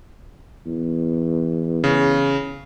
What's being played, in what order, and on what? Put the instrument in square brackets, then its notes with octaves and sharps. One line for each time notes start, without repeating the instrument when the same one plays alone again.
[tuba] E2
[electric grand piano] C#3